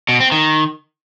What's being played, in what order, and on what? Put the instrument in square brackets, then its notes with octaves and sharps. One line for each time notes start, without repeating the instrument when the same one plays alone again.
[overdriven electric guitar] B2
C4
D#3